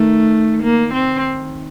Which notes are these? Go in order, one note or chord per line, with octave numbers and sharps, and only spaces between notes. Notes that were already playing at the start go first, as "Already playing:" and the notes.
Already playing: D#3 A3
A#3
C4